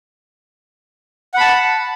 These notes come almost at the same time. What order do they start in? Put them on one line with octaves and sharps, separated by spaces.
F#5 B5 A5